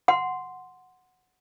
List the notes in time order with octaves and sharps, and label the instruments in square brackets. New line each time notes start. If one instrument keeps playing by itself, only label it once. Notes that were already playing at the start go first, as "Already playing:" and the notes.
[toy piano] F#5 C6